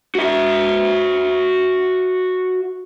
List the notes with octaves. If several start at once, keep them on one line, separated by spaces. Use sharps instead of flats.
F#4 E5